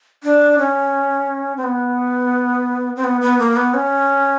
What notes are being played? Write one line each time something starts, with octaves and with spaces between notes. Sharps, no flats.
D4
C#4
C4
B3
C4
B3
B3
A#3
B3
C#4